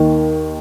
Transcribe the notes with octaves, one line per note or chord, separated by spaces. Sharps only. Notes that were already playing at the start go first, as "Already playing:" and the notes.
Already playing: D#2 D#3